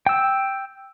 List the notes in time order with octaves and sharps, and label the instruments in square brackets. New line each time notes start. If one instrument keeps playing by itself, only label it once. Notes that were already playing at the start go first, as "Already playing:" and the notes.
[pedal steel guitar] G5 E6